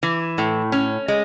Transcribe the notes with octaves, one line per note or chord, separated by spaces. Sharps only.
E3
A2
C#4
G#3